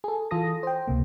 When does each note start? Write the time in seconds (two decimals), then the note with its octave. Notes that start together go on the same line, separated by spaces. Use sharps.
0.04 G#4 A4
0.31 E3 F4 A4 D#6 A#6
0.63 C5 G5
0.87 C#2 C3 A#3